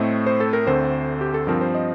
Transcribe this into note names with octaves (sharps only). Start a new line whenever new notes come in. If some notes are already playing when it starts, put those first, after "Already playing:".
Already playing: A2 A3 C4 D#5
C5
A4
A#4
D2 D3 A3 C4 C5
G4
A4
G2 F3 C4 A#4
C5
D#5